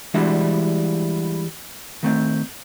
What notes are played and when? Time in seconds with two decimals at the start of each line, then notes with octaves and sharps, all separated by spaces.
0.14 E3 G3 G#3 D4 E4 F#4
2.03 D#3 A3 C4